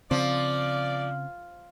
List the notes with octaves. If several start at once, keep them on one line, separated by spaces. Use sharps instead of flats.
C#3 F3 C4 D5